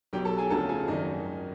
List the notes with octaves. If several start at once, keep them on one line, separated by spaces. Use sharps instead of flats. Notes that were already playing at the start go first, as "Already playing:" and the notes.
B1 B2 F#3 G4 G5
A4 A5
G#4 G#5
D2 C#3 F3 A4 A5
G#4 G#5
G#1 F#2 D#3 D#4 D#5